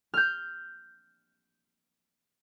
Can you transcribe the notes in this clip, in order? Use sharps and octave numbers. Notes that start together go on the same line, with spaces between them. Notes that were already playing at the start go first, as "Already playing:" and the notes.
F6 G6